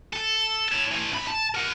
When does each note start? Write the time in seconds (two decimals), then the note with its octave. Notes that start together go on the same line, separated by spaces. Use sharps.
0.13 A4
0.69 C#5 A5
0.92 E3 A3
1.11 F#2 B5
1.28 A5
1.55 A#4 F#5